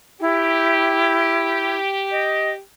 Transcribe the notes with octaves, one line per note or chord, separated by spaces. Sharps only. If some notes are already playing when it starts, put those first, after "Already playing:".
E4 G4
D#5